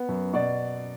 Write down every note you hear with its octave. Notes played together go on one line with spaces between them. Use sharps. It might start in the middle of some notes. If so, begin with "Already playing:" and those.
Already playing: B3
F#2
B2 D5